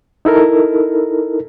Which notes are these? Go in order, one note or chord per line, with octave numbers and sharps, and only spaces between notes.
D#4 E4 A4 A#4